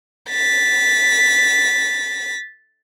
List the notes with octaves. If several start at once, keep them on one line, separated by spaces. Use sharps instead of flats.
A6 B6